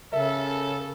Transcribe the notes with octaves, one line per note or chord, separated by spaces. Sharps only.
C#3 A4 A#4 E5